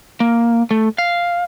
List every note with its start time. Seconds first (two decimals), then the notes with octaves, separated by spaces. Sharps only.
0.20 A#3
0.71 A3
0.98 F5